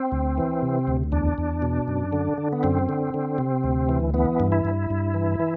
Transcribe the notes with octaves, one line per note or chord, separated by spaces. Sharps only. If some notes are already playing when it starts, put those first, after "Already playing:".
Already playing: C4
D2
E3
C3
D2
E2 D4
E2
B2
F#2
D3
D3
B3
F#2 C4
D3
D3
C3
D2
E3
E3 B3
G2
E4
G2
G2
E3
E3